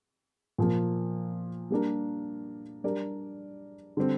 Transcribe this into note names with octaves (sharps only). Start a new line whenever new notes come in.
A#2 F3 A#3
G3 A#3 D4 A#4
G3 D4 G4 A#4 D5
D3 G3 C4